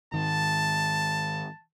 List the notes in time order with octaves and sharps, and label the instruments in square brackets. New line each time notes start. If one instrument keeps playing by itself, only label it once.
[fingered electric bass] G#2 D#3 [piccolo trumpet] A5